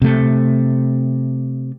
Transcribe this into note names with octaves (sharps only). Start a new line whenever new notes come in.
C3 A3